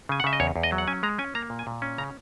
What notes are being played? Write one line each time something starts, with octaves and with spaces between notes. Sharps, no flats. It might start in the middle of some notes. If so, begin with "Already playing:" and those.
C#3 G#5
F#5
C#3 E5
D#5
E2 C#5
E2
D#5
F#3
F#5
C#4 G#5
G#3 A#5
C#4 G#5
A#3 A#5
A#2
G#5
A#2
C#4
C#3 A#5